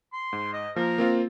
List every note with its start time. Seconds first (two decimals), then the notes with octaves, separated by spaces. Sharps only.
0.13 C6
0.33 G#2
0.53 D#5
0.76 F3 A#3 A#4
0.98 A#3 C4 F4